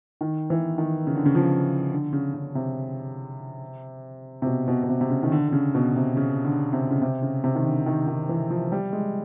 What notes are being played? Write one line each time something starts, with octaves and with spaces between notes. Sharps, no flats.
D#3
E3
D#3
C#3
D3
C#3
F3
D3
C#3
C#3
C3
C3
B2
B2
B2
C3
C3
C#3
D#3
D3
D3
C#3
B2
C3
C#3
D3
C3
C#3
C3
C#3
C3
D#3
D3
D#3
D#3
E3
F3
G3
G#3